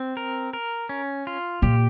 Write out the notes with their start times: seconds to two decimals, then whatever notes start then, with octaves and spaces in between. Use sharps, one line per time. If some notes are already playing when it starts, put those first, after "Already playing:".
Already playing: C4
0.17 A#4
0.53 A#4
0.89 C#4
1.27 F4
1.62 A#2 G4